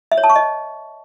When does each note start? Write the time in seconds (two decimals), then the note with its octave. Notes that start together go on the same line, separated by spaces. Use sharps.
0.12 E5
0.18 C#5
0.24 A5
0.30 C#6
0.36 D#5